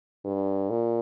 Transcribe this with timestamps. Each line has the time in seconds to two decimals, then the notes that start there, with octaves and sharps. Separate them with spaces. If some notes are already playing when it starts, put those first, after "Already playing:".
0.25 G2
0.70 A#2